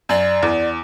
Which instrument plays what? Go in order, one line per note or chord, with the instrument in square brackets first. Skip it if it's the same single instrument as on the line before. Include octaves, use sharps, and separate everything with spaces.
[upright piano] F#2 [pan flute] D5
[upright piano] E2